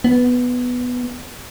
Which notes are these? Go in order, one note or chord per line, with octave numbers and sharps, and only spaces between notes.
B3